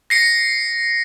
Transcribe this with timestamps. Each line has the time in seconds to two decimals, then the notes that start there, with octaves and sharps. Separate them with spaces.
0.10 A#6 C7 C#7